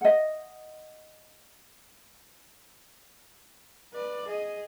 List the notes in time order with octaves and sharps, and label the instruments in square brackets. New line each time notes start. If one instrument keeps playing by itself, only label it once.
[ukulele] D#5 F#5
[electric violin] B4 D5
G#4 D#5